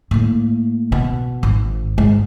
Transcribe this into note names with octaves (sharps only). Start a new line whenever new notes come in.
A2 A#3
B2
G#1
G#2